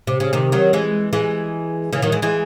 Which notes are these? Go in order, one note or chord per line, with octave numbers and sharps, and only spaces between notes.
C3
C#3
C3 D#3
D#3 F#3
E3 G#3
E3 G#3
C#3 E3
D#3 F#3
E3 G#3
E3 G#3